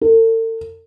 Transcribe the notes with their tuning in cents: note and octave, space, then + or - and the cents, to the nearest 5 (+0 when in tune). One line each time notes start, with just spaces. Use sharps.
A4 +45